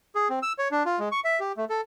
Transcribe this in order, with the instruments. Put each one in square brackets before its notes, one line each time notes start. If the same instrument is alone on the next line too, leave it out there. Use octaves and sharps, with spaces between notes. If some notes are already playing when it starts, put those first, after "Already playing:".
[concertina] G#4
C4
E6
C#5
D4
F4
G#3
C#6
E5
G4
A3
A4